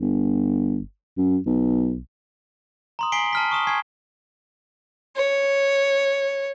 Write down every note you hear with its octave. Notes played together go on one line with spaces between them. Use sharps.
G1
F#2
B1
A#5 C6 D#6
G#5 B6 C7 D7 F#7 G7
A5 F6 B6
C#6 D#6 E7 G7
G#5 C#6 F6 G#6 C7
C#5